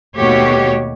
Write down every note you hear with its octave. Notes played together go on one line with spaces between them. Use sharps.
D#2 B2 A3 F#4 G4 C#5